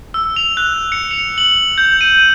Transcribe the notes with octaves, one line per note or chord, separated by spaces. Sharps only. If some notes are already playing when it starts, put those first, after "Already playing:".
E6
F7
F#6
C#7
F7
F#7
G6
D#7